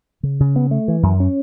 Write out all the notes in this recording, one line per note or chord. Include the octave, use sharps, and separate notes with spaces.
C#3
C#3
B3
A3
E3
F#2
C#4